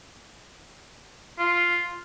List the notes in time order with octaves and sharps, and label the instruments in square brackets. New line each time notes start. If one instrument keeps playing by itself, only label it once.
[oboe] F4